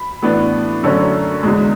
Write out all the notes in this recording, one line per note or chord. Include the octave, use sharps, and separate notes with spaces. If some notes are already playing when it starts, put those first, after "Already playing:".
Already playing: B5
A2 E3 B3 D4
F#2 D3 A3 C#4
E2 D3 G#3